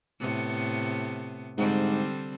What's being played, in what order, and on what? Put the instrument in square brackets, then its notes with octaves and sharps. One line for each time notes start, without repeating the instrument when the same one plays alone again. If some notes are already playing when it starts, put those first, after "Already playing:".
[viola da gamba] A2 C3 B3
[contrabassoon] G#2 [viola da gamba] D3 G3 C4